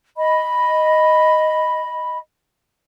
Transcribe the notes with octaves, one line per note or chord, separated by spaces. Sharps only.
D#5 B5